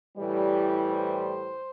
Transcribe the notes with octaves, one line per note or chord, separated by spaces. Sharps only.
A2 E3 G3
C5